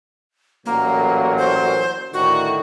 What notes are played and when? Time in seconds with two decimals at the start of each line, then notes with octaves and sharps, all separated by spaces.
0.66 A1 A#2 F#3 A#3
1.38 C5
2.14 A2 D3 D#3 F#4